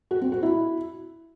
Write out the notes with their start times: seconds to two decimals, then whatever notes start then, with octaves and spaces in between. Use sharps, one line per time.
0.11 F#4
0.21 C4
0.32 F#4
0.43 E4